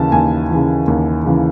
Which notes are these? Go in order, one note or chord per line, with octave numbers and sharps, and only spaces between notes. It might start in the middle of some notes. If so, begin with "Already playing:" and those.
Already playing: D#2 C#3 E3 A5
D#2 G#5
C#3 E3
D#2
C#3 E3